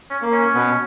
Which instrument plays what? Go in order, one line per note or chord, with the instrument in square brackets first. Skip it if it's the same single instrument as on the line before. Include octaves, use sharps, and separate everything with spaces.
[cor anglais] C#4
[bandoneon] A#3
[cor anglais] C#4
[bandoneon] B2 B3